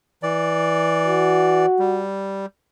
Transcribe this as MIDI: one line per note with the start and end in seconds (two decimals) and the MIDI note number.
0.23 1.66 52
0.23 1.66 74
1.06 2.05 66
1.79 2.46 55